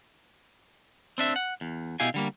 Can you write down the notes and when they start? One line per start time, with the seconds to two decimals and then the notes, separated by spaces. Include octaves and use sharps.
1.18 C4 D4 E5
1.36 F#5
1.61 E2
2.00 B2 E4 G4 F5 G#5
2.14 D3 G3 A#3